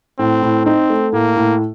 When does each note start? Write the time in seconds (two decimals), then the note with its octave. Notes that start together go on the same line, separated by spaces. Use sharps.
0.19 A2 C4
0.42 A2
0.65 C4 D#4
0.90 A3
1.13 A2 A#3
1.37 A2